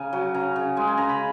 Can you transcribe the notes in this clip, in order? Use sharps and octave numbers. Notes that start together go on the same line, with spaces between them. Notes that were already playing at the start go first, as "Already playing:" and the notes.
Already playing: C#3 G#5 A#5
F#3
C#3 A#5
C#3
G#3 G#5
G#5
C#3 A#5
B5